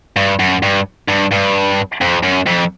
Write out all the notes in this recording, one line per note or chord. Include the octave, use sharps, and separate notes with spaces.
G2
F#2
G2
G2
G2
F2
F#2
F2